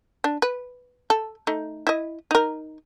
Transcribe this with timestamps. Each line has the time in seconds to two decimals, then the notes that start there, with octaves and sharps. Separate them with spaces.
0.24 D4
0.42 B4
1.10 A4
1.47 A3 D#4
1.87 E4 D#5
2.31 D#4 A#4